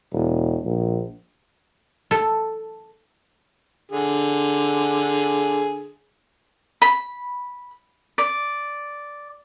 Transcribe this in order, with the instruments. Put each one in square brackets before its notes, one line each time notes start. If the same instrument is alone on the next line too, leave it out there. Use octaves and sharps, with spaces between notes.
[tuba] E1
A#1
[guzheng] A4
[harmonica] D3 G#4
[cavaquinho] B5
D5